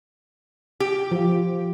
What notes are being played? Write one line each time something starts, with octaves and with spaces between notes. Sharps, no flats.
G4
F3 F4